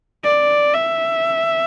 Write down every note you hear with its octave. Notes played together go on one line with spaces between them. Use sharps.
D5
E5